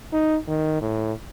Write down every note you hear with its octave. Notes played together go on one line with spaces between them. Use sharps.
D#4
D#3
A2